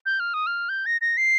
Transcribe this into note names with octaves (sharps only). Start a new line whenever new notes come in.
G6
F6
D#6
F6
G6
A#6
A#6
C7